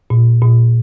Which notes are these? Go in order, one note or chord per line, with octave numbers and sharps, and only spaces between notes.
A#2
A#2